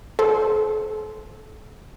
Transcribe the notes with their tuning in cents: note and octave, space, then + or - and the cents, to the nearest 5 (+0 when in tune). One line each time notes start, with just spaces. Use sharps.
A4 -40 C5 -10 E6 -35